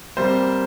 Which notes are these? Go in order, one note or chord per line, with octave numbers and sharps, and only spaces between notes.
C3 G3 A#3 C5